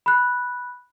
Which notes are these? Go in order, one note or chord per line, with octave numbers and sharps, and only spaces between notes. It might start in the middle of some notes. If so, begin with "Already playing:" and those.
B5 F#6